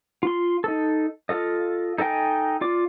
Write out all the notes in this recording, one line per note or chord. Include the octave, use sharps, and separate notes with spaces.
F4 C6
D#4 A4
F4 A4 D#5
D#4 A4 D#5 G5 G#5
F4 D5 D6